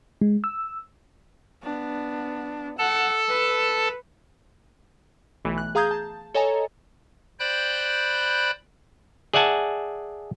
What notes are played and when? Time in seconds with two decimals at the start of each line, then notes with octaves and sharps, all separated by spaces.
0.21 G#3
0.44 E6
1.63 B3 D4
2.79 A4 F#5 A5
3.28 B4
5.45 B1 E3 A3
5.58 F#6
5.75 G#4 F5 A#5 D#6 G6 G#6
5.91 A5
6.34 A4 C#5 D#5 G#5 A#5
7.40 C5 D5 G5 B5 F#6 G6
9.34 G#4 D5 E5 F#5 G#5 A5